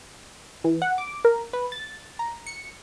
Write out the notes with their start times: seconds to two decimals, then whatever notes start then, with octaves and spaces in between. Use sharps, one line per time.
0.64 E3
0.82 F#5
0.98 D6
1.25 A#4
1.53 B4
1.72 A6
2.19 A#5
2.46 C#7